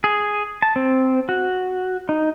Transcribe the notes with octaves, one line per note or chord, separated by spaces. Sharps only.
G#4
A5
C4
F#4
D#4